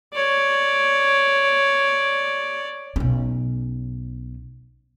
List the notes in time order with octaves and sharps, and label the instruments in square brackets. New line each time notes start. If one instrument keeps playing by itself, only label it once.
[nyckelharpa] C#5 D5
[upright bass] B1 C#4